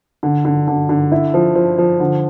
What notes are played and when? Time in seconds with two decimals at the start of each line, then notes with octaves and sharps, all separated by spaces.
0.23 D3
0.45 D3
0.68 D3
0.89 D3
1.12 E4
1.34 F3
1.55 F3
1.78 F3
2.00 D3